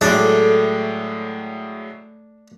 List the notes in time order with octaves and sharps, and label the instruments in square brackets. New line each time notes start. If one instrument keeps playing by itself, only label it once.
[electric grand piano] A2 F#3 G#3 [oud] A3 [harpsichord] D4